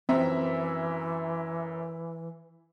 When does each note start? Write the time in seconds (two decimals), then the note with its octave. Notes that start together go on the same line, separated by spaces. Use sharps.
0.09 F#2 E3 C4 E5 A#5